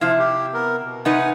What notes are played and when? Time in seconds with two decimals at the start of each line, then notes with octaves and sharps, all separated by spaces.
0.01 C3 F3 E4 F5
0.19 G4
0.54 B3 A#4
0.84 B2
1.05 C3 D#4 B4 F#5 G#5